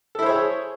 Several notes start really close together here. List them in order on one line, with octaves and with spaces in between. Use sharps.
A4 E4 C5 C#5 G#4